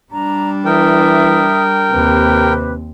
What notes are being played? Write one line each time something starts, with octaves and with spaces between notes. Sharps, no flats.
G3 D4 A#5
E3 A#4 E5 G5 D#6
D#2 C3 C4 G4 B4